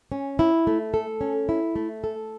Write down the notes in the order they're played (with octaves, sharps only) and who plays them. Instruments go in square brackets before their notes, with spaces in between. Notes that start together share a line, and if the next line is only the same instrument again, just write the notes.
[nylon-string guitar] C#4
E4
A3
A4
C#4
E4
A3
A4